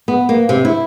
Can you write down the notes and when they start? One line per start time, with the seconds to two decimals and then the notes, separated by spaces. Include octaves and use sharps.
0.08 B3
0.29 A#3
0.49 C3
0.65 E4